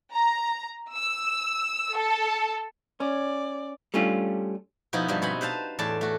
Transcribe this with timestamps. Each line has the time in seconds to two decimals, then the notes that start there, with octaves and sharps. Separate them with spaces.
0.15 A#5
0.94 E6
1.96 A4
3.00 C#4 D5
3.94 G3 A3 C#4 D4 F4
4.93 B2 F3 B3 D#4 E4
5.08 G2 F3 G3
5.22 B2 C4 F#5 G#5 B5
5.41 B4 C5 F5 A5
5.79 E2 A2 D5 A5
6.01 A3 F#4